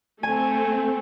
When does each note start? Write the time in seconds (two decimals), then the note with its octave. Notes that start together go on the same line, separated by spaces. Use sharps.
0.23 A3 C4 G#5